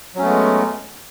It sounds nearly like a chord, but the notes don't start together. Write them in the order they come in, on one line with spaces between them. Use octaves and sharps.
F#3 C#4 A3 B3 G#3